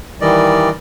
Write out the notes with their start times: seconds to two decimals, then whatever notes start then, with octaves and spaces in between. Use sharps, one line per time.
0.21 D#3 E3 G3 D5 D#5